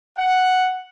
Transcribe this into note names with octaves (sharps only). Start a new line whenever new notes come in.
F#5